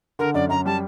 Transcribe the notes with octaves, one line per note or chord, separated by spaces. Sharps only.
D3 A#4
F#2 D5
F#2 A#5
G3 A5